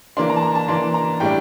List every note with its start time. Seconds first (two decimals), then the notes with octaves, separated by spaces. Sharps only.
0.17 E3 A#3 D4 C6
0.30 A#5
0.36 A5
0.42 A#5
0.55 A5
0.68 E3 A#3 D4 C6
0.94 A#5
1.20 A2 G3 D4 G5